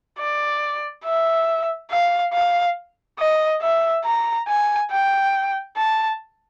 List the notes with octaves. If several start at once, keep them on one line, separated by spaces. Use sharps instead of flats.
D5
E5
F5
F5
D#5
E5
A#5
G#5
G5
A5